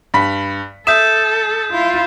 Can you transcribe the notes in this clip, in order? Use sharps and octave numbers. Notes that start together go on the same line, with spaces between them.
G2 B5 B6
A4 E5 D#6 G6 E7
E4 F4